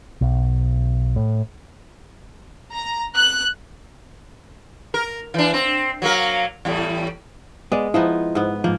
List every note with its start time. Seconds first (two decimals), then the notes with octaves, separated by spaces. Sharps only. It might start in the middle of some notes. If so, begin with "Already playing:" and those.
0.21 B1
1.16 A2
2.72 A#5
3.16 F#6
4.94 A#4
5.34 E3 D4
5.54 C4
6.02 F#3 A#3 A#4
6.65 E2 A2 G3
7.72 G#3 B3 D5
7.94 F3 B3 D#4 E4
8.35 G#2 B3
8.64 G#2 F3 A#3